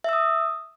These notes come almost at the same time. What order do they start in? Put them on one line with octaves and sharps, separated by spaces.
E5 E6 D#6